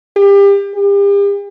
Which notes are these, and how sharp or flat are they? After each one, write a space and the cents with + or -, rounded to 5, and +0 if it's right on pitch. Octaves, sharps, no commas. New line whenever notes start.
G4 +30
G4 +40